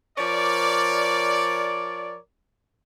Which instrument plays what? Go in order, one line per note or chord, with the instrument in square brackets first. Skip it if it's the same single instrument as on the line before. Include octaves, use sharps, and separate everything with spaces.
[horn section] F3 A#4 C#5 D5